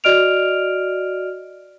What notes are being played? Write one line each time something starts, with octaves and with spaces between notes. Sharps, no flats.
F#4 D5 D#5 F6 D7 F7